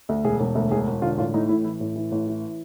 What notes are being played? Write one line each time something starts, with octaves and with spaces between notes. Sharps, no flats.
D2
E1 G#4
E1
D2
E1 G#4
E1
D3 F4
A1 F4
A2 D#4
A1 E4
E3 E4
A1
E3
A1
E3